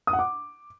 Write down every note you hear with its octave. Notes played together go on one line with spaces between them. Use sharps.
D#6
F#5
D6